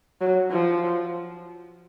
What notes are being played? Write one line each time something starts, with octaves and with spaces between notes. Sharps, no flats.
F#3
F3